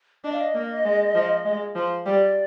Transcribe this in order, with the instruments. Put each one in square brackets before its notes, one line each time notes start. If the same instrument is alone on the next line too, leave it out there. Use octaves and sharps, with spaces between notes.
[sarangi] D4 [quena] D#5
[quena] F5
D#5
[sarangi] A#3
G#3
F3
G#3
F3
[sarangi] G3 [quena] D5